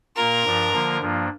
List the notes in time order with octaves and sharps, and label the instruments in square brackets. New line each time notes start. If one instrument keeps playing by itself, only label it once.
[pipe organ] A#2 A#3 F4 [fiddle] A#4
[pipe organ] G2 F3 D4 F4
D3 F3 A#3 F4
G2 F3 A#3 D4 F4